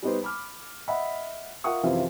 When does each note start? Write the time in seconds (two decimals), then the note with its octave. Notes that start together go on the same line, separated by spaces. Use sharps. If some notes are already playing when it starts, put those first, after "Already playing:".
0.03 G3 B3 D#4 B4 C5
0.23 B5 D6 F6
0.88 D#5 E5 F#5 B5
1.64 F4 A#4 E5 F#5 C#6 D#6
1.83 F#2 C3 E3 F3 E4 F4